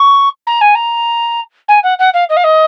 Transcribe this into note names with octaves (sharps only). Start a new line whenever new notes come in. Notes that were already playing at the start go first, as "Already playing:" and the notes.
Already playing: C#6
A#5
G#5
A#5
G#5
F#5
F#5
F5
D#5
F5
D#5